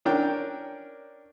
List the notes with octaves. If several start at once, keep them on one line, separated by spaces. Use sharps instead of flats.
C#4 D4 A#4 G5